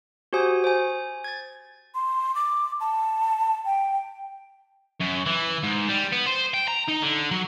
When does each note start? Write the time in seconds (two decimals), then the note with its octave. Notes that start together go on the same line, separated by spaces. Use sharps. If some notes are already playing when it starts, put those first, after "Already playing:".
0.33 F#4 G4 C5 G#5 D#6
0.64 C5 G#5
1.24 G#6 A6
1.95 C6
2.35 D6
2.80 A5
3.65 G5
5.01 F#2
5.27 E3
5.64 G#2
5.89 G3
6.13 B3
6.27 C5
6.54 G5
6.68 A#5
6.88 D#4
7.02 D3
7.31 F#3